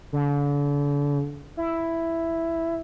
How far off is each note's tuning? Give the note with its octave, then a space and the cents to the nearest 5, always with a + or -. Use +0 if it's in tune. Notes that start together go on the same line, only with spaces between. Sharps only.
D3 -40
E4 +5